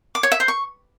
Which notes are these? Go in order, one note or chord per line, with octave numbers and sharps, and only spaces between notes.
D6
C#5
E5
C5
C#6